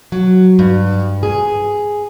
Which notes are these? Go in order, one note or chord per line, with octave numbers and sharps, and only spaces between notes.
F#3
G2
G#4